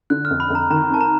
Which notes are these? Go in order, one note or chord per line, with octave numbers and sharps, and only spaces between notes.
D3 F#6
F6
F2
B5
F2
A#5
D#3 A#5
C4 A5
A#5